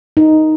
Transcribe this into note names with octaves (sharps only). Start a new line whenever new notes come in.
D#4